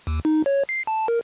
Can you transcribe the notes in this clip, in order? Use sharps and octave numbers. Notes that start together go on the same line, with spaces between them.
D#2
D#4
C#5
C7
A5
A#4